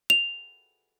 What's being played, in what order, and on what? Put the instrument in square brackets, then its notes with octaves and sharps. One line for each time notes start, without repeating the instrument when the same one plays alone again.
[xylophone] F7